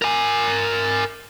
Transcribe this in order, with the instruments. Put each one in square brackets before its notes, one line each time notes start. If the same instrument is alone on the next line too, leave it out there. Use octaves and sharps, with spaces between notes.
[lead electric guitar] A#4 G#5